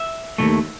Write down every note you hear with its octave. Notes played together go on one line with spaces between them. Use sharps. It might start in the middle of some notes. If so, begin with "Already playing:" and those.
Already playing: E5
D#2 D#3 A3